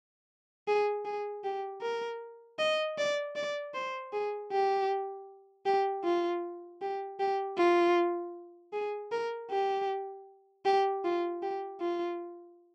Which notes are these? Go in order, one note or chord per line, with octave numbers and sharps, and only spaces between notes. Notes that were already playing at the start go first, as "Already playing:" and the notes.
G#4
G#4
G4
A#4
D#5
D5
D5
C5
G#4
G4
G4
F4
G4
G4
F4
G#4
A#4
G4
G4
F4
G4
F4